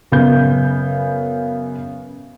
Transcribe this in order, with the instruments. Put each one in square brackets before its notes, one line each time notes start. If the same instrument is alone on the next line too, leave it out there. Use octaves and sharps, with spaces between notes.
[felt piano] F#2 C#3 B3 G6